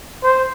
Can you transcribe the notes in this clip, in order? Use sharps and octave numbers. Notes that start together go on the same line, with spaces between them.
C5